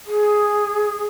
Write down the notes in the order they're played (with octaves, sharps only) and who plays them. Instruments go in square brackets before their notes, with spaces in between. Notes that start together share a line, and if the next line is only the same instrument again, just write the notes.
[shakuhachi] G#4